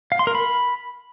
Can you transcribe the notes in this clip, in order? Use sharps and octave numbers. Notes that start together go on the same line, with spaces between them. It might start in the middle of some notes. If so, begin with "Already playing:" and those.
F5
C6
A#4
B5